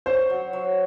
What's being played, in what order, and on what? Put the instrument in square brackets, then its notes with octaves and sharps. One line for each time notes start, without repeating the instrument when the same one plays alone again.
[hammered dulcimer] C#4 [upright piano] C5
[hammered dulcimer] F#3
F#3